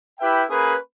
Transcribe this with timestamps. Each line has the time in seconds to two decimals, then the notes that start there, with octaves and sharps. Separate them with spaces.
0.18 E4 G4 B4 E5 G5
0.49 A#3 C#4 G#4 B4